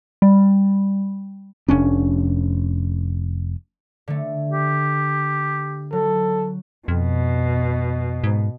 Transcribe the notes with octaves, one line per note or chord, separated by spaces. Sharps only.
G3
F1 C#4 D4
D3 A3
G4
F#3 A4
F2 B2
G#2